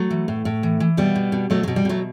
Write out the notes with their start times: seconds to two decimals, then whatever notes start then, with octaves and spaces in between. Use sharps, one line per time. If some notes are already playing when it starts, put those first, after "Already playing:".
Already playing: F#3 A3
0.10 E3
0.28 A2
0.45 A2
0.63 E3
0.80 E3
0.97 B2 G3 B3
1.15 B2
1.32 B2
1.50 B2 F#3 A3
1.63 B2 F#3
1.76 G3
1.85 B2 F#3 A3